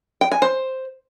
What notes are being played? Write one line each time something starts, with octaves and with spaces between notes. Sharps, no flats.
G5
G#5
C5